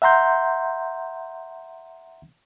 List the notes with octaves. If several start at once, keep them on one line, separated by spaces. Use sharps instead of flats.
E5 F#5 A#5 C6 G6